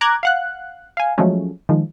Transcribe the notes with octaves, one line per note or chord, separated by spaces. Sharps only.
A#5 D6 F#6 G#6
F5 F#5 F#6
F5 G#5
F3 F#3 G#3 A3 C#4
D#3 F3 G#3